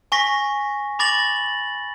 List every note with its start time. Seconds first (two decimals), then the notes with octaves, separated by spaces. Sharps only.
0.12 G#5 C#6 A#6 B6
0.99 B5 D6 A6 A#6 F#7